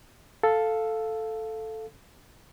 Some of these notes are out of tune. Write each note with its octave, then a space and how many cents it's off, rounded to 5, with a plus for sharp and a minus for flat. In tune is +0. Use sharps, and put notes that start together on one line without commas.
A4 +0 F5 +0